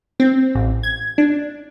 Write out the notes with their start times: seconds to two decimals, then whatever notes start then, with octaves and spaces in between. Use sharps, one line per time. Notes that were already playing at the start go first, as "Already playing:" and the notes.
0.20 C4
0.55 A1
0.83 G#6
1.18 D4